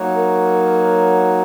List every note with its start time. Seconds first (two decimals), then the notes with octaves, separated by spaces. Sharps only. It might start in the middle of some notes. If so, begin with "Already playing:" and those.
Already playing: F#3 A#3 D#4 F#4 C#5
0.15 A#4